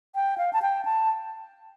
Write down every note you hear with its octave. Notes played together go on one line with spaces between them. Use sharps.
G5
F5
A5
G5
A5